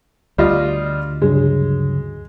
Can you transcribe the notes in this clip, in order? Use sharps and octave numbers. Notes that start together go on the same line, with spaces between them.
D2 G3 F4 D5 D#5
G2 C#3 F#3 G#3